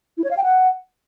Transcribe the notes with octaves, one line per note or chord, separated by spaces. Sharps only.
E4
C#5
F5
G5
F#5